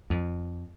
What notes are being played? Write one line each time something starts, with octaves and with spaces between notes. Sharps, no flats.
F2